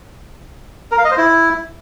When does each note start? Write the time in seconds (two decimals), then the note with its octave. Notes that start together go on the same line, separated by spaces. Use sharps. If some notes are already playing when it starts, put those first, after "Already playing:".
0.91 A#4
0.98 F5
1.05 D#5
1.11 C5
1.18 E4